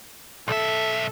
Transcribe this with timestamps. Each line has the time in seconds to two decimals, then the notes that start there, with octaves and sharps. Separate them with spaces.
0.48 B1 A4 E5